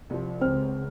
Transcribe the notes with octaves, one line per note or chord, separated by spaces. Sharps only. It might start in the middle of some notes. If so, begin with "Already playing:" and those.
C2 F3
C#2 C4 F6